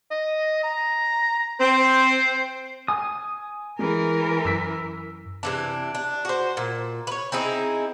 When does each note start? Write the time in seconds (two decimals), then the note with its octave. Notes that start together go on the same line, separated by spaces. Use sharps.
0.11 D#5
0.64 A#5
1.60 C4 C5
2.88 G#5 D#6
3.79 E3 G#3 A#4
4.45 F#2 E6 B6
5.43 C3 E3 D4
5.95 D4
6.25 F#4 C5
6.57 A#2
7.07 B4 C#5
7.32 C4 D#4 E4 G#4